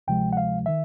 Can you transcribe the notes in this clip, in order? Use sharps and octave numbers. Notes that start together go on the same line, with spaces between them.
D2 C3 F3 G#3 G5
F#5
F5
D#3 E5